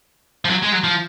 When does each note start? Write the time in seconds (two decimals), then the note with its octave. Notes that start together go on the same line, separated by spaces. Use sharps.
0.45 F3
0.50 F#3
0.63 G#3
0.72 F#3
0.84 F3